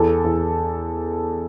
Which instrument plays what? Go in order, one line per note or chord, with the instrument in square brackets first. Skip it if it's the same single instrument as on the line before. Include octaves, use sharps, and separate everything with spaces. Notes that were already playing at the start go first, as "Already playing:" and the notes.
Already playing: [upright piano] E2 A4
E2